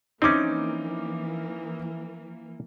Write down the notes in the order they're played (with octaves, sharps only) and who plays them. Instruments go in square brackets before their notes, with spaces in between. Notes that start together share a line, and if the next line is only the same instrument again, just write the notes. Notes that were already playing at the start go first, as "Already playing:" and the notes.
[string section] E3 F3 A#3 [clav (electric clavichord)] C4 C#4 [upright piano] D#4 D6